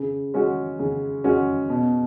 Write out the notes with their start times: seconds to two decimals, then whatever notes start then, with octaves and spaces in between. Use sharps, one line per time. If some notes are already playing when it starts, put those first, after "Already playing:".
Already playing: C#3
0.34 G#3 C#4 F#4
0.79 C#3
1.24 G#3 C#4 F#4
1.70 B2